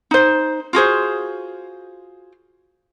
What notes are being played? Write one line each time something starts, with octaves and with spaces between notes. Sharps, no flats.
D#4 C5
F4 F#4 G#4 C5